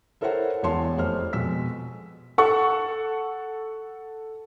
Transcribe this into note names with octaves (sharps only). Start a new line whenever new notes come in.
E4 A4 A#4 C5 C#5 F#5
E1 E2 C#5 A5 C6
F1 C5 F6
F2 B2 G#3 E6 B6
A4 F#5 C#6